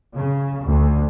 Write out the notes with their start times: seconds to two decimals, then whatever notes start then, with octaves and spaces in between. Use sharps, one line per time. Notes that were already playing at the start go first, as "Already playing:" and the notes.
0.17 C#3
0.64 D2